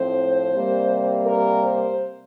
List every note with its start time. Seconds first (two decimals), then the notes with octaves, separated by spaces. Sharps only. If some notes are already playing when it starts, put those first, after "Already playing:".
Already playing: A2 F3 C4 C5
0.52 C3 G3 A#3
1.25 A#4
1.62 C5